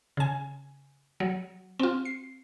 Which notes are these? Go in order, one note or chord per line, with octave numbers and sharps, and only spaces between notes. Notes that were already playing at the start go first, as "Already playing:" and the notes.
C#3 G#5
F#3
C4 F4
C7